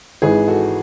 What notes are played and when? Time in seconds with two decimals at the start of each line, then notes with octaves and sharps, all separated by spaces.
0.22 G#1 G#2 E3 G#4 B4
0.48 F#4 A4